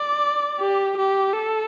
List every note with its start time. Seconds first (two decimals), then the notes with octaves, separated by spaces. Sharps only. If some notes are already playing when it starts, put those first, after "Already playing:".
Already playing: D5
0.61 G4
0.98 G4
1.33 A4